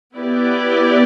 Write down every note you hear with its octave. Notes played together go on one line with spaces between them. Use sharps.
B3 E4 G4 B4 D5